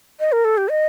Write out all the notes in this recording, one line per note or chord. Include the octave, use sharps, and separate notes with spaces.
D#5
A#4
A4
G4
D#5